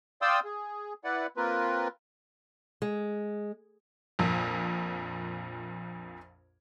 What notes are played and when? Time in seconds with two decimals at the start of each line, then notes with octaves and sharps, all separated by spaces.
0.22 D5 F5 G5 C6 D#6 E6
0.44 G#4
1.04 E4 B4 D5 F#5
1.37 A#3 C4 F4 A#4 B4
2.82 G#3
4.19 A#1 F2 A#2